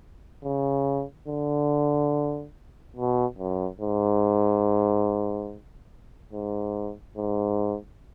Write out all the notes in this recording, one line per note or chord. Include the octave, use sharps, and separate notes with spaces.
C#3
D3
B2
F#2
G#2
G#2
G#2